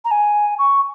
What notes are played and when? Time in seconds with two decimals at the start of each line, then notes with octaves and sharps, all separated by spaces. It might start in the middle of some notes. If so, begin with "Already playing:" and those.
0.05 A#5
0.11 G#5
0.59 C#6